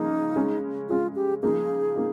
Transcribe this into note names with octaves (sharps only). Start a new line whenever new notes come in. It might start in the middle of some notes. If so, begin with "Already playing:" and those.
Already playing: C#3 F3 A#3 D#4
C#3 G#3 C#4
C#3 G#3 C#4 F4
G4
C#3 F3 A#3 D#4 G#4
A#3 D#4